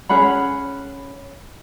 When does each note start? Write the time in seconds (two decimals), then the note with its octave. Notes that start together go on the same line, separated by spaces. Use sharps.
0.09 C#4 G#4 F#5 B5